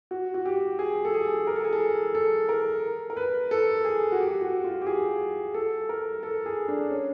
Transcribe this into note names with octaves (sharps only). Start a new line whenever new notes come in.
F#4
F#4
G4
G#4
A4
G#4
A#4
A4
G#4
A4
A4
A#4
A#4
B4
A4
G#4
F#4
G4
F#4
F4
G4
G#4
A4
A#4
A4
G#4
D4
C#4